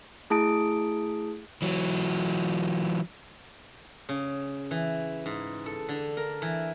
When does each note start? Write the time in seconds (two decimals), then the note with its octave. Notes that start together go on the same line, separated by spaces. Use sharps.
0.30 A3 E4 G#4 A5 D#6 D7
1.62 E3 F#3
4.09 C#3
4.71 E3
5.26 G#2
5.66 A4
5.89 D3
6.17 A#4
6.42 E3